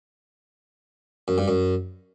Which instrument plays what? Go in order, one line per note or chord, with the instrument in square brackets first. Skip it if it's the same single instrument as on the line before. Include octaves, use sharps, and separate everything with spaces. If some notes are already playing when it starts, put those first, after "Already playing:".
[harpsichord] F#2
G2
F#2